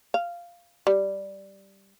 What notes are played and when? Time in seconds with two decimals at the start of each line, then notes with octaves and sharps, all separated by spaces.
0.14 F5
0.87 G3